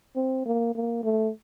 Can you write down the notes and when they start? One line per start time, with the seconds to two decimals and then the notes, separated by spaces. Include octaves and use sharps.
0.16 C4
0.46 A#3
0.75 A#3
1.03 A3